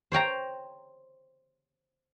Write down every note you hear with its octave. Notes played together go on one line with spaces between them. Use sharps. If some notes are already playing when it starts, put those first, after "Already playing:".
C5 C#5 G5 A#5